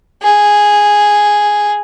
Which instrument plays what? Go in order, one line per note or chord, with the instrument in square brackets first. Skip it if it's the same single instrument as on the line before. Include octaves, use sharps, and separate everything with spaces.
[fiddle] G#4